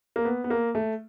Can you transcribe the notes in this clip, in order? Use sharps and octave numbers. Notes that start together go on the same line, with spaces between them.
A#3
B3
B3
A#3
A3